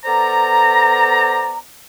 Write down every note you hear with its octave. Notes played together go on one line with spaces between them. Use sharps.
B3 A4 C5 D5 A#5